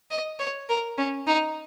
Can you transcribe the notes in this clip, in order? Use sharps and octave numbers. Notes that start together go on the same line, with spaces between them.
D#5
C#5
A#4
C#4
D#4